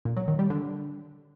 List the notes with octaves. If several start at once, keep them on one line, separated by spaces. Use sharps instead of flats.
A#2
F#3
D#3
G3
D3